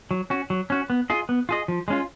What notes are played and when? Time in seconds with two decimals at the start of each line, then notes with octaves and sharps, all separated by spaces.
0.11 F#3
0.30 C#4 F#4
0.50 F#3
0.70 C#4 F#4
0.90 B3
1.10 F4 G#4 D#5
1.29 B3
1.49 F4 G#4 D#5
1.68 F3
1.88 G#3 C#4 F4